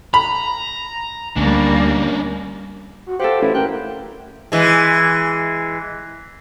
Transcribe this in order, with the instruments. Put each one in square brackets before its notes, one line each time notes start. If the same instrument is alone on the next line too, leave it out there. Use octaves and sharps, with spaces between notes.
[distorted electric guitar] A#5 [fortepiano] B5
[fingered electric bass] D2 [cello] G3 A#3 [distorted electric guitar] C#4 D4
[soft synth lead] F#4
[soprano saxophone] G4 [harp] A4 F5 F#5 [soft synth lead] C5
[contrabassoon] A1 [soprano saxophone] E4
[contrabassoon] A1 [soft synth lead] A#4 [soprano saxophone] G5 [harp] F#6
[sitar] E3 G#3